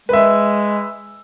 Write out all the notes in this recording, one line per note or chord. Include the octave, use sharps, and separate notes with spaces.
G#3 B4 E5